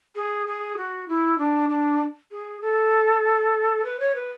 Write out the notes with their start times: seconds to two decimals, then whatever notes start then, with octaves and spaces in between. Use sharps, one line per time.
0.15 G#4
0.47 G#4
0.77 F#4
1.08 E4
1.38 D4
1.69 D4
2.31 G#4
2.61 A4
3.84 B4
4.00 C#5
4.15 B4